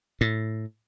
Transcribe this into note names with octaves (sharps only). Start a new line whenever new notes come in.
A2